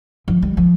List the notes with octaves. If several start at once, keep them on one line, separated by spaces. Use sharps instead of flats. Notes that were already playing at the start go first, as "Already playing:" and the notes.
F3
G3
F3